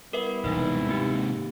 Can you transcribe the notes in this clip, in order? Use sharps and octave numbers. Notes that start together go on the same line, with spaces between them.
G3 B3 E4 A#4 B4 E5
E1 G#2 C3 D#4
A#3 D#4 G4